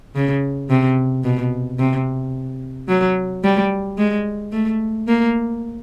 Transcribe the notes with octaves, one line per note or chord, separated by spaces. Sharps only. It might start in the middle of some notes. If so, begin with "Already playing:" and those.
C#3
C3
B2
C3
F#3
G3
G#3
A3
A#3